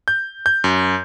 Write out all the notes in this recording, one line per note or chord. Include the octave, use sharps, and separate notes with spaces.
G6
G6
F#2